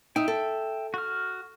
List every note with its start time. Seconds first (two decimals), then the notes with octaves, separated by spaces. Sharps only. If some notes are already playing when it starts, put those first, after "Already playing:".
0.16 D#4 E5 G5
0.28 A4
0.94 F#4 F6